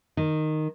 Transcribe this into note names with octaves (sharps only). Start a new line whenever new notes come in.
D#3